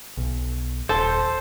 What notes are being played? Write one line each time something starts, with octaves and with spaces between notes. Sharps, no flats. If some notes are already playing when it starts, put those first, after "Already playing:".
B1
D#1 A4 C5